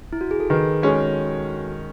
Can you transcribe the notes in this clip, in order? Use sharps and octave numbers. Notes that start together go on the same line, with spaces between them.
E4
F#4
G#4
A4
D#3 G#4 B4
G#3 C#4 F#4 A4